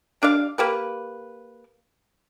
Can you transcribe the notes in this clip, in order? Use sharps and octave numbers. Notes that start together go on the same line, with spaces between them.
G3 D4 D5 F5
A#3 G4 B4